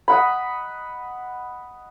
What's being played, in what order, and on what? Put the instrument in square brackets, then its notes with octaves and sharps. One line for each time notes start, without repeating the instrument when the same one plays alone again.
[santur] D#5 F#5 B5